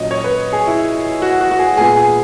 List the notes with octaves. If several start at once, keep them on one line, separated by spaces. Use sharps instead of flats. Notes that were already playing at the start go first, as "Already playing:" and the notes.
Already playing: A#2 F#3 C#4 D#5
C#5
B4
G#4
E4
F#4
F#4
F#4
G#4
A#2 G#3 B3 G#4
G#4